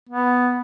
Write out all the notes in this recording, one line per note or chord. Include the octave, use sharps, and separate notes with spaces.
B3